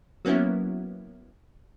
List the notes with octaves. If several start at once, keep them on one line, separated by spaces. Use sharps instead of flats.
F#3 A#3 B3 C#4 E4